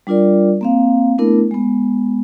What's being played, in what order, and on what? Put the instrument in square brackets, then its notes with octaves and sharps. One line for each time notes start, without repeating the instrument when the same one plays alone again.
[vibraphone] G3 D4 F4 A#4 D5
A#3 C4 F5
A3 B3 D4 E4 A#4
G#3 B3